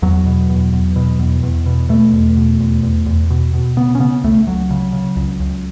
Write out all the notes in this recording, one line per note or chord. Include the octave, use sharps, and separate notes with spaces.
E2 F#3
B2
E2
E2
B2
E2
E2
B2
B2 A3
E2
B2
E2
E2
E2
B2
B2
C#3 B3
C#4
C#3 B3
C#2 A3
C#2 F#3
C#3
C#3
C#2
C#2